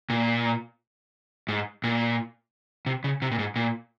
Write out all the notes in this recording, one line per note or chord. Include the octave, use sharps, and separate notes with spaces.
A#2
G#2
A#2
C3
C#3
C3
A#2
G#2
A#2